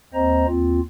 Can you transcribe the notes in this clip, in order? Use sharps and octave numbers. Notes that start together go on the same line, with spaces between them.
D#2 C4 C5 D#5 A#5
D#2 C4 F4